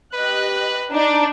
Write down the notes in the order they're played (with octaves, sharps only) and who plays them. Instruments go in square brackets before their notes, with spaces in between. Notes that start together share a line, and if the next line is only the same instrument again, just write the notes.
[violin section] G4 D#5 F#6 [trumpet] B4
[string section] D4 [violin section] D#4